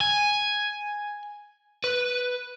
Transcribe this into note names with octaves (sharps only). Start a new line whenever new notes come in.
G#5
B4